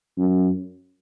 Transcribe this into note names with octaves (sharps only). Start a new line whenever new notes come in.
F#2